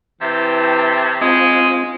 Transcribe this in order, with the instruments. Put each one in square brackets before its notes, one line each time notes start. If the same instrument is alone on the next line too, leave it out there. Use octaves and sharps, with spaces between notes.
[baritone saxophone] C3 [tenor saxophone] E3 [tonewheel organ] E5 G5 A5
[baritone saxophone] G#3 [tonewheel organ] C4 F4 [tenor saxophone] D#5